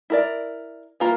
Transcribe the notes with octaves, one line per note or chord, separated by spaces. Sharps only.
E4 A#4 D5
E3 A#3 F4 A#4